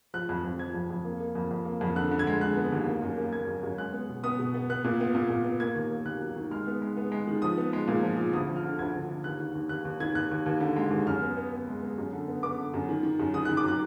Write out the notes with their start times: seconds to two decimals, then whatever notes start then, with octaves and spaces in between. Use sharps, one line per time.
0.14 F3 F#6
0.29 F2
0.44 F2
0.59 F3 G#6
0.75 F2
0.90 F2
1.05 A#3
1.20 A#3
1.35 F2
1.51 F2
1.65 A#3
1.81 F2
1.96 D3 F#6
2.11 D3
2.19 G#6
2.27 G#3
2.41 D3 F#6
2.57 B3
2.72 D#2
2.88 A#3
3.02 F#2
3.18 A#3
3.32 A#3 G#6
3.48 F#2
3.63 F#2
3.78 G#3 F#6
3.93 B3
4.09 B2
4.24 B3 D#6
4.39 B2
4.54 B3
4.70 B3 F#6
4.84 A#2
5.00 B3
5.15 A#2
5.30 A#2
5.44 B3
5.60 A#3 G#6
5.75 D#2
5.91 A#3
6.05 D#2 F#6
6.21 F#3
6.36 D#3
6.51 G#3 F6
6.67 B3
6.82 G#3
6.97 B3
7.12 G#3
7.27 D#3
7.42 F3 D#6
7.57 B3
7.73 G#3
7.88 A#2
8.03 F3
8.18 F3
8.33 D2 D#6
8.48 F3
8.56 F6
8.64 D3
8.79 D2 G#6
8.94 D2
9.09 D3
9.24 D#2 F#6
9.40 D#3
9.55 D#2
9.69 D#2 F#6
9.85 D#2
10.00 D#3 G#6
10.15 D#2 F#6
10.31 D#2
10.46 D#2
10.61 D3
10.76 G#3
10.91 D#2
11.07 F#2 F6
11.22 B3
11.37 B3
11.52 B3
11.68 G#3
11.82 B3
11.98 F#2
12.13 D3
12.28 B3
12.43 B3 D6
12.58 D3
12.74 F#2
12.89 D#3
13.03 D#3
13.20 F#2
13.34 D#3 D#6
13.45 F#6
13.49 D#3
13.57 D6
13.64 F#3 F#6